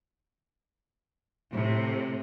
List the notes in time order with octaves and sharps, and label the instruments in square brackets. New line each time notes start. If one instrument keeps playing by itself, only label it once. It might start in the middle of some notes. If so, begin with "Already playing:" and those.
[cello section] A2 C3